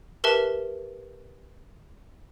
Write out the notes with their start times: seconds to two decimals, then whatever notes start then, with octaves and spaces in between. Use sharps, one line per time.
0.24 G4 A#4 B4 E5 A5